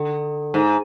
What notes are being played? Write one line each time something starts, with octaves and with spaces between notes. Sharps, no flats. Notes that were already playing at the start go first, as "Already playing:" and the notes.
Already playing: D3
G#2